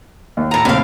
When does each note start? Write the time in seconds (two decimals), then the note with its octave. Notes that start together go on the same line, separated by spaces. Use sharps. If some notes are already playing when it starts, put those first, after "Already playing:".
0.37 D#2
0.51 A2 A#5
0.65 F1 D#2 A2 C3 F5